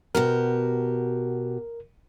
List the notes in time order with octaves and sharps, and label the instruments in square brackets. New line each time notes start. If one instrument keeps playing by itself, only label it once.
[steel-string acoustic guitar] B2 F#4 G4 [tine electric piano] A#4